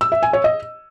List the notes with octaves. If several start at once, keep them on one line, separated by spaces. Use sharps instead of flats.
E6
E5
G#5
C#5
D#5